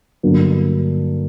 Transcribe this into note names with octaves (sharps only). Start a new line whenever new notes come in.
G2 D3 F#3 A#3